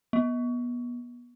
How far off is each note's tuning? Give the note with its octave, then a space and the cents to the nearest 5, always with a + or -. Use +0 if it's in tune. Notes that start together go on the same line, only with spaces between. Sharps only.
B3 -25